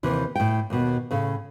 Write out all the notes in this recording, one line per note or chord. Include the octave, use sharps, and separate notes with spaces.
D#2 C3 E3
A2 G5
D#2 B2
A2 C#3